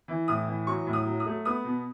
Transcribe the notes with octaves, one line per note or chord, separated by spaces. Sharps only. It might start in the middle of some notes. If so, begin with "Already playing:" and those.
E3
A2 D#6
E3
F#3 C#6
A2
D#6
F#3
D#6
A3
B3 D#6
B2